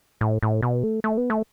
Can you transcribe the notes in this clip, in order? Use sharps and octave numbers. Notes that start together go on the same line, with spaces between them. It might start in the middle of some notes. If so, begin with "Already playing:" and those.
A2
A2
B2
A3
A3
B3
A3